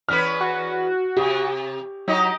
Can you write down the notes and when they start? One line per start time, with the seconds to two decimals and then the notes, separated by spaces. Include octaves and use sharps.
0.09 E2 C#4 B4 F6
0.41 F#4
1.17 C3 G4
2.08 F#3 D#4 G4 D#5